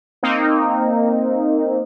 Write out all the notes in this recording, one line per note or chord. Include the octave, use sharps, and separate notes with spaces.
A#3 C4 D#4